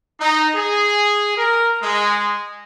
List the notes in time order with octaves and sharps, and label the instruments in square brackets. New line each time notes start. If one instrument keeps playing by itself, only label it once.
[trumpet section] D#4
G#4
A#4
G#3